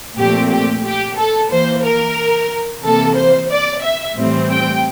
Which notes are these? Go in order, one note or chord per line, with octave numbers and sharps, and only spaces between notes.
A#2 F3 A3 C4 G4
G4
G4
A4
E3 A#3 C5
A#4
C3 E3 A#3 A4
C5
D5
E5
A2 E3 G3 C4
G5